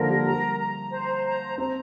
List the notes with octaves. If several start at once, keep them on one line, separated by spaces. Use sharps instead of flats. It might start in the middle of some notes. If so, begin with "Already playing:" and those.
Already playing: D3 F3 A#3 A#4
G3
G3 A#5
A#5
C5
A#5
C4 A#5